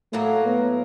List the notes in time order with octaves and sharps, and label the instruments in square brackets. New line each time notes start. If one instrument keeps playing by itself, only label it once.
[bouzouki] A2 F#3 A#3 [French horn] A3
[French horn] B3